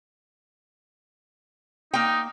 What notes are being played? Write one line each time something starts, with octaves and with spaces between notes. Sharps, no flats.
A#3 D#4 G5